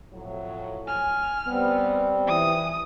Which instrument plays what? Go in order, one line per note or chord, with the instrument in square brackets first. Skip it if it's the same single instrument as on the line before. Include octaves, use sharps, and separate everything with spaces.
[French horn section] F2 A2 F#3
[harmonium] G#5 [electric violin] F6
[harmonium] G3 C4 [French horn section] B3
[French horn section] E3 [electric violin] D#6